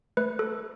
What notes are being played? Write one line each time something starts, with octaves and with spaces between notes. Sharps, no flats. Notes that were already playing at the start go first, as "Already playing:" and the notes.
A3 B4
A4